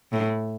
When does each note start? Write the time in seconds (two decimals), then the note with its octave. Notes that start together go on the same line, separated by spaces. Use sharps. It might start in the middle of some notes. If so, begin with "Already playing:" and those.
0.12 A2